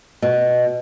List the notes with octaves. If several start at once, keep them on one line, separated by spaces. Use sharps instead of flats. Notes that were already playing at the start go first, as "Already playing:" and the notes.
B2